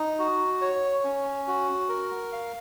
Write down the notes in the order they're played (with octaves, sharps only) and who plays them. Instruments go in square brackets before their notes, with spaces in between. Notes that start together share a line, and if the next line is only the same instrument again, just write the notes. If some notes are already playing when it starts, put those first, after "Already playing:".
Already playing: [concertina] D#4
F#4
C#5
C#4
F#4
A#4
F5